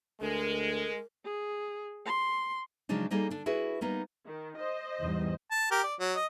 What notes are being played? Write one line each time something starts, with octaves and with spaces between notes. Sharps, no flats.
D2 G#3 A4 A#4
G#4
C6
C#3 F3 F#3 G#3 D4 D#4
G3 A#3 D#4 G#4 A4
D3 D4
E4 F#4 G#4 B4
G3 A#3 B3 D#4
D#3
C5 D#5
E2 G#2 G3
A5
G4 A#4
D5
F#3
D#5